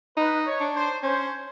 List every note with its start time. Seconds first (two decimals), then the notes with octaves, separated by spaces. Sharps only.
0.17 D#4 B4
0.46 C#5
0.60 D4
0.74 C5
1.02 C#4 C5